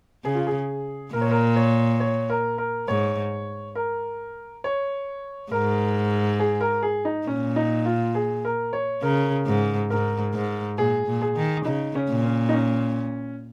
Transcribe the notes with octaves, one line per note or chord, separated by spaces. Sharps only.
C#3 G#4
F4
G#4
A#2 A#4
C#5
A#4
C#5
C#5
A#4
A#4
G#2 C#5
A#4
C#5
G#2 A#4
G#4
A#4
G#4
D#4
A#2 C#4
D#4
F4
G#4
A#4
C#5
C#3 A#4
G#2
G#2 A#4
G#2
A#2 G#4
A#2
G#4
D#3
C#3 D#4
C#4
A#2
C#4
D#4
C#4